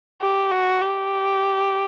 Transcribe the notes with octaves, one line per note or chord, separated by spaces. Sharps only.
G4
F#4
G4